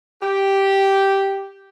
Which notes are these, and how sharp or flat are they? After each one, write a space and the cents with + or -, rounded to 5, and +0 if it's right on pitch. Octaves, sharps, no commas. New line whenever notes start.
G4 -5